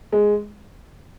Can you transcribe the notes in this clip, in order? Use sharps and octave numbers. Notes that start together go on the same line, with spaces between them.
G#3